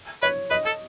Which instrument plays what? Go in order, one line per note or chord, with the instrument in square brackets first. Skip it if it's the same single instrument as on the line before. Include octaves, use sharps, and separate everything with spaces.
[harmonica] B4 [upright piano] C#5
[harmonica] B4 [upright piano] D#5
[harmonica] A4